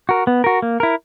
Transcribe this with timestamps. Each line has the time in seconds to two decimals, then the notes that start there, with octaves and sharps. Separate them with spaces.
0.09 F#4 A#4
0.27 B3
0.44 F#4 A#4
0.62 A#3
0.80 E4 A#4